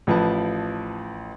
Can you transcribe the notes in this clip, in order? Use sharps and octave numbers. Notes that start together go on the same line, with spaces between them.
A1 F3 B4 A5